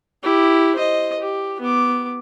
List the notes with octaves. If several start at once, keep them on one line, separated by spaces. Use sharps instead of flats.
E4 G4
C5 D#5
G4
B3 D6